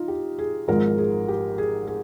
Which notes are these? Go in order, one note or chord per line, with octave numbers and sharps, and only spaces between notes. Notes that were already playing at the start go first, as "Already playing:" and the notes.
Already playing: D#4 F4
G4
G#4
G#1 G#2 F3 G#3 A#4
G#4
G4
G#4
G#4